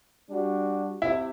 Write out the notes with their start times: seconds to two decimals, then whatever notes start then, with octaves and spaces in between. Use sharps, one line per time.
0.29 G3 D4 F#4
1.02 C3 E4